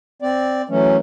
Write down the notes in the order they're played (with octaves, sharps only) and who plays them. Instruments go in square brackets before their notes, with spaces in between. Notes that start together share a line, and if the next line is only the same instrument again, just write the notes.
[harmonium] C4 D5
E3 F#3 A3 C#4